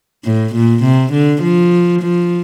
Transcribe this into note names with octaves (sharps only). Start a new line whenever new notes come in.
A2
A#2
C3
D3
F3
F3